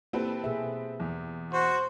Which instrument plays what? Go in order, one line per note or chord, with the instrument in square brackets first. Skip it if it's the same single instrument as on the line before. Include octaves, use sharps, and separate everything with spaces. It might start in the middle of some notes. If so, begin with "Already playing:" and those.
[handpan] A#3 E4 G4 [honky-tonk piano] C4 A4 B4
[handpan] B2 G#4 E5
[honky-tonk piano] E2
[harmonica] F#4 [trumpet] C5